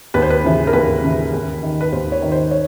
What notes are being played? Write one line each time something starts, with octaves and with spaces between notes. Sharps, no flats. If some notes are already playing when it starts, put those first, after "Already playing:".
D#2 B4
C5
B4
C#3 E3
A#4
D#2 B4
C#3 E3
D#2
D#3
B4
D#2 C5
C#5
D#3
C5
C#5